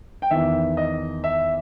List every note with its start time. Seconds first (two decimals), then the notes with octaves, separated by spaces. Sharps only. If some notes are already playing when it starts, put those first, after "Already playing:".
0.22 G5
0.31 E2 D#3 E5
0.77 D#5
1.24 E5